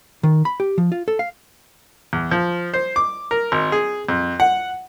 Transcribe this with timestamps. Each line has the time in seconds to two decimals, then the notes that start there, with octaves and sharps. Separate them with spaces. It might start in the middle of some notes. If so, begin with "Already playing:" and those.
0.23 D#3
0.45 B5
0.60 G4
0.78 F3
0.92 F4
1.08 A4
1.19 F5
2.13 E2
2.31 F3
2.74 C5
2.96 D6
3.31 A#4
3.52 G#1
3.72 G#4
4.09 F2
4.40 F#5